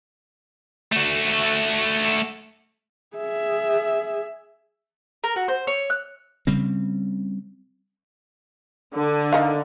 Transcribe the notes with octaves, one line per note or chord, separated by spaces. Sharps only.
A3 F#4
G#4 E5
A#4
F#4
C5
C#5
F#6
C#3 G3 C4
D3
D#4 A#4 F5